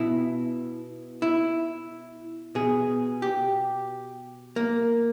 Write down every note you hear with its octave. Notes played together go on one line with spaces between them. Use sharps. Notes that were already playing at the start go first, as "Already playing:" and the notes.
Already playing: B2 E4
E4
B2 G#4
G4
A#3